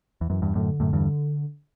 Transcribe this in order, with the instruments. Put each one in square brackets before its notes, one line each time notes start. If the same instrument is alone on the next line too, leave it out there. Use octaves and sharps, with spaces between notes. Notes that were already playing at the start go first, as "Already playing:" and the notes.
[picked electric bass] E2
[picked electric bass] F#2 [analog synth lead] E3
[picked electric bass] E2 G2
[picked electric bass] F#2 A2 [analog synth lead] D3
[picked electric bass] F#2 A2
E2 G2